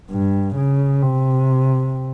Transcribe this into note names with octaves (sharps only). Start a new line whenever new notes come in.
G2
C#3
C3